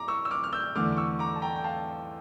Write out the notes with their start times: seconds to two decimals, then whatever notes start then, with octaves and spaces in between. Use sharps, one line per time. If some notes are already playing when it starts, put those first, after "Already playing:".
Already playing: A#5 D6
0.08 C#6 E6
0.25 E6
0.31 D6 F6
0.44 F6
0.53 E6 G6
0.76 E2 D3 A3 D6 F6
0.92 D6
0.97 C#6 E6
1.19 A#5 D6
1.36 A5
1.42 G5 A#5
1.56 G5
1.64 F5 A5